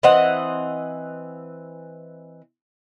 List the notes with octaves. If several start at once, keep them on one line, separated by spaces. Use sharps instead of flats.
E3 C4 D#5 F#5